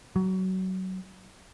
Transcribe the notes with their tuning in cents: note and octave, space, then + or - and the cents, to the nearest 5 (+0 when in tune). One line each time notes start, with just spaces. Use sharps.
F#3 +20